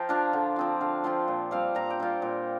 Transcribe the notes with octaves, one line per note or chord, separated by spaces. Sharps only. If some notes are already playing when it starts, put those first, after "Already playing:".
Already playing: F3 F5 G5 A#5
D4 F4
D3
F3 C4 F4
D3 F5
F3 C4 F4 C6
A#2
G3 C4 F4 F5
A#2 A#5
G5
G3 C4 F4
A#2